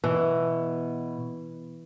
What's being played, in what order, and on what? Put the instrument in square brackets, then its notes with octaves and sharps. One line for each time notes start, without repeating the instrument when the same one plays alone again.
[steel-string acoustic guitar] B2 [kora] E3